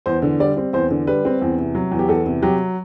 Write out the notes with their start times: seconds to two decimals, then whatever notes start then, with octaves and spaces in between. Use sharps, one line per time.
0.06 E2 C5
0.22 D3
0.40 G3 D5
0.57 C4
0.73 E2 C5
0.91 D3
1.07 G3 B4
1.25 C4
1.42 E2
1.58 C3
1.75 F#3
1.92 E2
1.99 G4
2.09 E2 A4
2.26 C3
2.42 F#3 G4